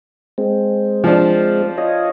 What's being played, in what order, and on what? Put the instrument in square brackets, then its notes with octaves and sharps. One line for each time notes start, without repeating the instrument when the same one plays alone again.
[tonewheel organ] G#3 C4
[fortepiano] F3 D4
[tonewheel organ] F4 C#5 D#5